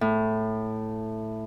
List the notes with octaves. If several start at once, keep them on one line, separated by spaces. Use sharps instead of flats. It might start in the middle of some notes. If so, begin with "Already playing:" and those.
A2